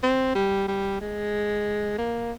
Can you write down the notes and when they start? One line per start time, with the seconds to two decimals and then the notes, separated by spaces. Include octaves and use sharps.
0.03 C4
0.35 G3
0.68 G3
1.01 G#3
1.98 A#3